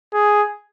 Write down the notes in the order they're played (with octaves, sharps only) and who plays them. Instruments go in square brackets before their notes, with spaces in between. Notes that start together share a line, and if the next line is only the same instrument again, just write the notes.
[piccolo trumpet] G#4